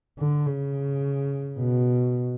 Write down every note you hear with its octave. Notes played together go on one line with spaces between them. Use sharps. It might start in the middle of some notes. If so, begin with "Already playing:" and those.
D3
C#3
B2